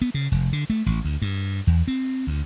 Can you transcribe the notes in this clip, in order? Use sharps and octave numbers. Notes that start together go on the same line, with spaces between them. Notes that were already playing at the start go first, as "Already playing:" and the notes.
B3
C#3
F1
D3
A3
A1
D2
G2
E2
C4
D2